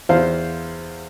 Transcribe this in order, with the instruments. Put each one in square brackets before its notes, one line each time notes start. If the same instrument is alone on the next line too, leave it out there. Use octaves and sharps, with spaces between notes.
[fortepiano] E2 C5 F5